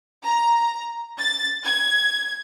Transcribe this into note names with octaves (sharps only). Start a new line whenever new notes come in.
A#5
A6
G#6